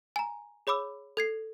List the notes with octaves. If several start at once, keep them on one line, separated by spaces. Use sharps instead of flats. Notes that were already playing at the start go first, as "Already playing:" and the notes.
G#5 A#5
G#4 C#5 B5 D6 E6
A4 G#6 C7